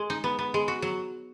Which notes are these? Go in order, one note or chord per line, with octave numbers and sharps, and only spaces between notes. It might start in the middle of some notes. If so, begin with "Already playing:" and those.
Already playing: G#3
D#4
B3
B3
G#3
F#4
F#3